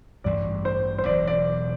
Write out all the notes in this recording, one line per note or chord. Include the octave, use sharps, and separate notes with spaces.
A1 G2 E3 G3 D5
C5
C5
E1 E2 B2 F#3 D5
D5